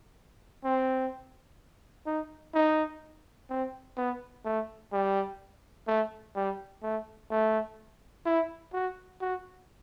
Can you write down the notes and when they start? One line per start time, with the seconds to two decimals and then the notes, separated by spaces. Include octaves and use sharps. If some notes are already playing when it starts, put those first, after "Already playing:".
0.64 C4
2.07 D#4
2.55 D#4
3.50 C4
3.97 B3
4.45 A3
4.93 G3
5.88 A3
6.35 G3
6.83 A3
7.30 A3
8.26 E4
8.73 F#4
9.21 F#4